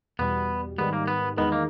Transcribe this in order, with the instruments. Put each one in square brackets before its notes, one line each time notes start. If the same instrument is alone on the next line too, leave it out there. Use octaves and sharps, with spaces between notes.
[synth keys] E2 B2 G3 [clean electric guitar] B3
[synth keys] G#2 D#3 G3 [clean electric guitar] B3
[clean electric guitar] A#3
B3
[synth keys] E2 D#3 G#3 D#4 A#4 [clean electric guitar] B3
[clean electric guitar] A#3